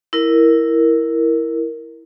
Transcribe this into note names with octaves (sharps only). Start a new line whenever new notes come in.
E4 A#4